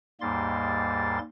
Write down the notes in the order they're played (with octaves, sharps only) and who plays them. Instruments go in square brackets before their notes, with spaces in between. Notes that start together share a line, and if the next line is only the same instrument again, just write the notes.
[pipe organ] D#2 G#2 G3 A#3 C6 A6